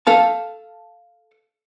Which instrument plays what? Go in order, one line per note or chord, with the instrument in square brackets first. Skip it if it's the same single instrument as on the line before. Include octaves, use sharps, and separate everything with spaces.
[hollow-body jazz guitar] A4 F5 A5